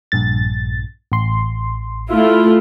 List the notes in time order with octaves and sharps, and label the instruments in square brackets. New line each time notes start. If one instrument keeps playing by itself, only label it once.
[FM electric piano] A#1 G2 A6
A1 C6
[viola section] A3 E4 F4